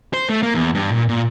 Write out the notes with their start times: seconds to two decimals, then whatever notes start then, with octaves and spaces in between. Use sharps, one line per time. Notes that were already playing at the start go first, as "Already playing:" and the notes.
0.14 C5
0.29 A3
0.43 A#3
0.54 E2
0.75 G2
0.92 A#2
1.09 A#2